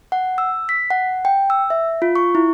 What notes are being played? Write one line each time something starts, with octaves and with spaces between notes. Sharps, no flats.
F#5
E6
B6
F#5
G5
E6
E5
F4
C#6
E4